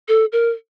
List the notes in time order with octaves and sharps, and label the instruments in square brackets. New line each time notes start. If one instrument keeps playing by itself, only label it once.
[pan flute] A4
A#4